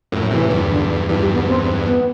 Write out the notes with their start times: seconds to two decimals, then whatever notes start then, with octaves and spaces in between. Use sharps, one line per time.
0.12 F#2 A2
0.31 A2 C3 E3
0.50 E2 G2
0.69 D3
1.08 E2 G2 E3
1.21 G3
1.34 B3
1.47 C4
1.86 B3